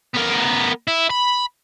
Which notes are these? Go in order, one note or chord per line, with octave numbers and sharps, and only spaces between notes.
B3 A#4
E4
B5